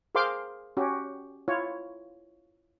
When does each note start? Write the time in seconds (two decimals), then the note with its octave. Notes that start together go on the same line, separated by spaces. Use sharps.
0.15 G#4 A#4 C5 F5 C6 D6
0.77 C#4 F#4 G4
1.48 E4 F4 C#5